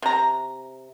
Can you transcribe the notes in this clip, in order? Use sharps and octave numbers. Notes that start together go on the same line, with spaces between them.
C3 A#5